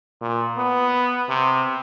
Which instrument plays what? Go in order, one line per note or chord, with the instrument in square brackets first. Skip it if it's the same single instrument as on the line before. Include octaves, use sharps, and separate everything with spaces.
[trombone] A#2
B3
C3